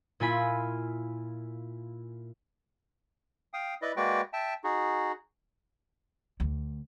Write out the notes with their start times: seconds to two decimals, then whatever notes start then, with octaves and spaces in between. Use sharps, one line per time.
0.20 A#2 E4 F4 G#5 B5 B6
3.54 F5 G5 D#6
3.82 E4 B4 D5 D#5
3.97 G#3 A#3 F#4 B4 D5 G5
4.33 E5 G5 A5
4.64 D#4 F#4 G#4
6.40 D2